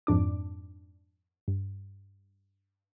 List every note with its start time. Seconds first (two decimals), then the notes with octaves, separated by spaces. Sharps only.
0.07 F2 G#2 D4 D6
1.48 G2